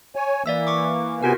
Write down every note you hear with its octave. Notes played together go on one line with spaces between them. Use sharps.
C#5 G#5
E3 A#3 D5 E5 E6
C#6 D6
C3 B3 F4 F#4 A#4 G#5